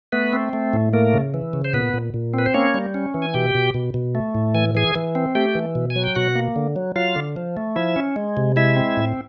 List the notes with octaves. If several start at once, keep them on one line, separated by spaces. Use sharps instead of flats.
A3 B3 B4
C4
A3
A2
A3 A#3 A#4
C#3
E3
C#3
C5
A#2 B3 B4
A#2
A#2
C4 B4
C5
A#3 C#4 C#5
G3
C#4
E3
G#5
B2 G4 G5
B2
B2
B2
A3
A2
E3 G#5
E3 G#4 G#5
E3
C4
A3 G4 G5
E3
B2
G#5
F#3
G5
B2 F#4 F#5
A#3
D3
F#3
F#3 F4 F5
D3
F3
A3
F3 E4 E5
C#4
G#3
C3
G#3 E4 E5
C4
A2